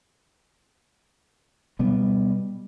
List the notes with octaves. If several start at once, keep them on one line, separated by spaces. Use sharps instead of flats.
B2 G3 B3